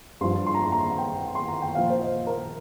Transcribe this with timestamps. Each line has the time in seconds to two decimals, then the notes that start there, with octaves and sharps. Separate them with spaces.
0.21 G2 C6
0.24 F3
0.46 C6
0.54 A#5
0.62 C6
0.72 A#5
0.98 G5
1.35 C6
1.48 A#5
1.62 G5
1.75 A#2 F3 F5
1.90 C5
2.01 D#5
2.27 A#4